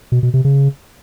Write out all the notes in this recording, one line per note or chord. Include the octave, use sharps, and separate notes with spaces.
B2
B2
C3
C#3